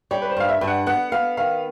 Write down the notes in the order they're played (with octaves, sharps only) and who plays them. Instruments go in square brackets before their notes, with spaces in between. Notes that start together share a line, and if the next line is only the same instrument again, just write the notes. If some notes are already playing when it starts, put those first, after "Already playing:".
[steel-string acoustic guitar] G3 [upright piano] C#5
[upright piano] B4
C5
[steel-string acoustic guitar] G2 [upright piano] F5
[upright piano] E5
[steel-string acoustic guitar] G2
[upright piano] F#5
[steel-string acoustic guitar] B3 [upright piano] F#5
[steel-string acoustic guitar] B3 [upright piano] F5
[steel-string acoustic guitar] D#3 [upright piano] F5